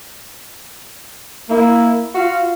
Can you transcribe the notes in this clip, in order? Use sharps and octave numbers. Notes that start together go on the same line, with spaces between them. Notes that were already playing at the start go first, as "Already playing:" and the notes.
A#3 E4
F4 F#4 F5